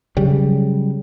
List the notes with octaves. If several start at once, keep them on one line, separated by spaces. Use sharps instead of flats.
C#3 F#3 G3